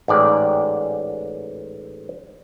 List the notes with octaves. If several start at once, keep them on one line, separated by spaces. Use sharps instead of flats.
A1 G#2 D5